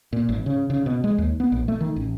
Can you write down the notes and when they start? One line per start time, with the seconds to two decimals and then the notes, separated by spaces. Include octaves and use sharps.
0.13 A#2
0.29 G#1
0.46 C#3
0.70 C#3
0.86 B2
1.04 G#3
1.18 D#2
1.40 B3
1.52 A#1
1.68 A3
1.81 D#3
1.96 A1